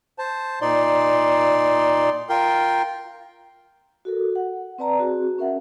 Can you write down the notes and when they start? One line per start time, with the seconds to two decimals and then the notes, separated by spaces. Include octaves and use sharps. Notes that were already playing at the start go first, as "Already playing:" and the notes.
0.18 C5 A5
0.61 A#2 D#4 D5 C6
2.29 F4 A#4 G5 C6
4.05 F#4 A4 A#4
4.36 F#5
4.78 C4 B4 D5 A5 A#5
4.98 C4 F#4 G#4
5.38 C#4 A#4 E5 F#5